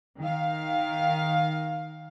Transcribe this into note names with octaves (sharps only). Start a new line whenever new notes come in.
D#3 F5